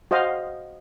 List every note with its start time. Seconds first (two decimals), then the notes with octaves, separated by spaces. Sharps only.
0.11 F#4 C5 D#5 F5